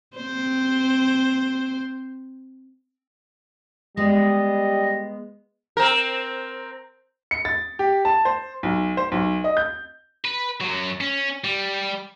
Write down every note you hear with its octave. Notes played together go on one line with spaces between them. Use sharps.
C4 C5
G3 G#3 B3 D#5
C4 A#4
C#7
A6
G4
A5
C5
B1
C5
B1
D#5
G6
B4
F#2 F#3
C#4
G3